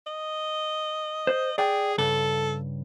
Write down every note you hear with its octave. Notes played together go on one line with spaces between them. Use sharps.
D#5
C5
G#4 D5 G5
G2 C#3 A4